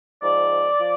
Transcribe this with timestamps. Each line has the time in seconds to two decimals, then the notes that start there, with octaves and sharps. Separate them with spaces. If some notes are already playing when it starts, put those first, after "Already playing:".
0.22 G#2 F3 D5
0.80 F3